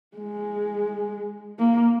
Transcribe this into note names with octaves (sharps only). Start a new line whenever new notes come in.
G#3
A#3